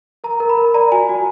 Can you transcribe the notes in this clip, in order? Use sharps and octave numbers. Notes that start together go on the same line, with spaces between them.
A#4 A#5
A#4
B5
A#4
D5 A#5
F#4 G#5
F#4